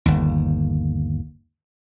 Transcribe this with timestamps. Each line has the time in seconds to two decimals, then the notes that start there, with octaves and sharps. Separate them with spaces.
0.06 G1 D#2